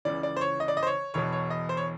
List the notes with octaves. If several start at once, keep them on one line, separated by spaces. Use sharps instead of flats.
C#2 C#3 E3 D5
D5
C5
C#5
D#5
D5
D#5
C5
C#5
E1 E2 B2 C#5
C#5
D#5
C5
C#5